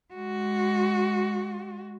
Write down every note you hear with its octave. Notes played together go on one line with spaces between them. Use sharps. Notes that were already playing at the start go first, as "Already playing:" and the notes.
G#3 F#4